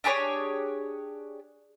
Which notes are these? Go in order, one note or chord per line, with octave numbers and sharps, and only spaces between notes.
D4 G4 G#4 C#5